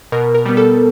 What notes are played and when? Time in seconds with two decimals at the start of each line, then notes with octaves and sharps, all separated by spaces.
0.12 B2 A#4
0.35 A#4
0.45 G3 B3
0.57 A4